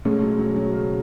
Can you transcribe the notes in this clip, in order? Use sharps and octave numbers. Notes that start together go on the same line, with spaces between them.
B2 G#3 A3 C#4
F#3
F#3
F#3
C#3